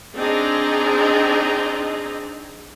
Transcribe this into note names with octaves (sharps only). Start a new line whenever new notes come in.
C4 D4 D#4 G#4 D#5 A#5